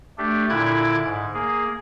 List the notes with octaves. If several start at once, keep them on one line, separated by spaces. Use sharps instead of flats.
A3 D4 G4
A#2 D3 E4 D6 F#6 G#6
G#2
A#3 G#4